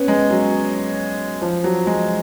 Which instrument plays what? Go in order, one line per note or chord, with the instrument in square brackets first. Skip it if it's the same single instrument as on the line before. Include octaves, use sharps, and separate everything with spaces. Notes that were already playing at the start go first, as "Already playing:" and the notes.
Already playing: [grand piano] B3 C#4
G#3
F#3
F3
F#3
G#3